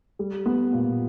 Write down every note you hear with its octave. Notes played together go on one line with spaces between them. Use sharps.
G3
B3
A#2